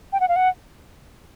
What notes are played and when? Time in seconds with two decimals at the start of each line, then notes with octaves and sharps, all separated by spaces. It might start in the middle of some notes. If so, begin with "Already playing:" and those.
0.13 G5
0.20 F#5
0.29 F5
0.36 F#5